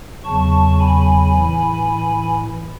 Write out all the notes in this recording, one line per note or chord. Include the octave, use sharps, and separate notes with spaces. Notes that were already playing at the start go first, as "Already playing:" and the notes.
E2 C#3 F#3 A5 C#6
G#5 B5
A2 E3